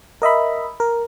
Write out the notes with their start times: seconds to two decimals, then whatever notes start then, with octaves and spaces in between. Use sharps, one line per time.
0.22 A#4 D#5 E5 B5
0.80 A#4